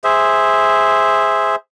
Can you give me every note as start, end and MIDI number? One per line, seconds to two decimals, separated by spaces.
0.04 1.56 68
0.04 1.56 72
0.04 1.56 76